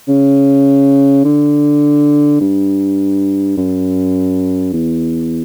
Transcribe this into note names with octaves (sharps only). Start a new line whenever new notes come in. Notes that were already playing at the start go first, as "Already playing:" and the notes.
C#3
D3
G2
F#2
E2